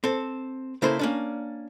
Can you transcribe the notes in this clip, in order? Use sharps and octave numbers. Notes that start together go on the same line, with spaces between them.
C4 A4
C#3 A#3 E4 A4 C5
A#3 C#4 D4